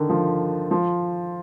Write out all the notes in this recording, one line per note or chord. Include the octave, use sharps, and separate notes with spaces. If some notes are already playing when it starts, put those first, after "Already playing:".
Already playing: D3 D#3
F3
F3